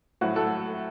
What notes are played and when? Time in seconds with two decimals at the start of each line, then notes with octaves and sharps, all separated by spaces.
0.21 A2 F#3 F#4
0.36 F#4 A4